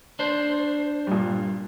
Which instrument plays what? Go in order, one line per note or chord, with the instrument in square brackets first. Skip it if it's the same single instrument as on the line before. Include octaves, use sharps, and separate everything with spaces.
[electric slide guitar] D4 C5
[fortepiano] G2 A#2